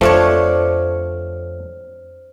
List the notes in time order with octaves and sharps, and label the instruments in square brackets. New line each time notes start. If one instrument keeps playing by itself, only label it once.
[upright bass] F2 [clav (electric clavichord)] F3 A3 [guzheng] C4 D4 C#5 [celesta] C5 F6